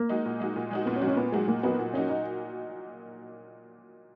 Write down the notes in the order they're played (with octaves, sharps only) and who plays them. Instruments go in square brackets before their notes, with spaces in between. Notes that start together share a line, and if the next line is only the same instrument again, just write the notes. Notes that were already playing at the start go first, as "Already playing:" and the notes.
Already playing: [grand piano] A#3
[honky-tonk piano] G#3 D#4 F#4
A#2
G#3 D#4 F#4
A#2
G#3 D#4 F#4
[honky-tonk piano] A#2 [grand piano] B3
[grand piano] C#4
[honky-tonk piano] G#3 D#4 F#4
[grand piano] C#4
[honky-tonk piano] A#2 [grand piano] B3
[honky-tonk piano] F#3 A#3 D#4 F#4 [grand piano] G#3
[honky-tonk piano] A#2 [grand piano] A#3
[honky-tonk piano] F#3 A#3 D#4 F#4 [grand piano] B3
[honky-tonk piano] A#2
[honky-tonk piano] F#3 A#3 D#4 F#4 [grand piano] C#4
[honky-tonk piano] A#2 [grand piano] D#4